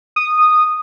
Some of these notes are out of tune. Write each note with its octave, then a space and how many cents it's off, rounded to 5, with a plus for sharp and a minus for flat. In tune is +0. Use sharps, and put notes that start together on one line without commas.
D#6 -10